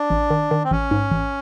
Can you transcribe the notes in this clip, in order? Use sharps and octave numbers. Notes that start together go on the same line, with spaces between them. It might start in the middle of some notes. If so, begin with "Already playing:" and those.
Already playing: D4
A1
D#3
D#3
C4
A1 C#4
G#2
A1